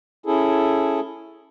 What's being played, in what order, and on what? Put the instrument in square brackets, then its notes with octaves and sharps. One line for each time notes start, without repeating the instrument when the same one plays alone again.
[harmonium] C#4 E4 G#4 A4